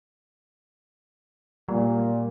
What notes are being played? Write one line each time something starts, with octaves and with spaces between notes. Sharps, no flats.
A#2 G3